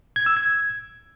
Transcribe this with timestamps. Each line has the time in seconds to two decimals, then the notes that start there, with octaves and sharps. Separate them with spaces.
0.16 G#6
0.26 E6
0.37 G#6